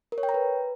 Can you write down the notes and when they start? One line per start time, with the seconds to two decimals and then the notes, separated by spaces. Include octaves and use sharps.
0.12 A#4
0.18 C#5
0.23 G5
0.29 A#5
0.34 B4